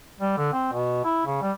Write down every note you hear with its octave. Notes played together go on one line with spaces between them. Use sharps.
G3
D3
C4
B2
E4
C#3
G3